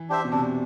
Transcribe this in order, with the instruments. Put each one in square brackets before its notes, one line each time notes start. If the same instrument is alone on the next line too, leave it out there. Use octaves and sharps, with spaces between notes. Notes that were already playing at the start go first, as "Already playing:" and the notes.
Already playing: [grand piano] E3
[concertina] D4 G4 C5 E5
[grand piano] B2
[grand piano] C3 [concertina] D4